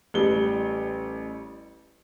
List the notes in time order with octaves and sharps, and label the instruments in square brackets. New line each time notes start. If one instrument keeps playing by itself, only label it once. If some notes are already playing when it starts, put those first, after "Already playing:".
[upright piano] A1 G3 G7